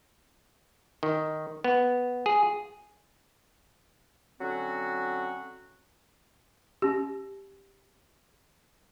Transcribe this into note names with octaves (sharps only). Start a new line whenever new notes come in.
D#3
B3
G#4
D3 F#3 C4 C#4 F#4
C#4 G4